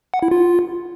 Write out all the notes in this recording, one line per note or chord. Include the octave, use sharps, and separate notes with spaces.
F#5
E4
F4